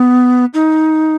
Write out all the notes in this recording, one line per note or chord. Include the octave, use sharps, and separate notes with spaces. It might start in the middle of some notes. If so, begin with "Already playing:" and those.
Already playing: B3
D#4